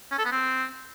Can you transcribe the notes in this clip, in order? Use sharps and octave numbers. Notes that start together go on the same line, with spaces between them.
C#4
A4
B3
C4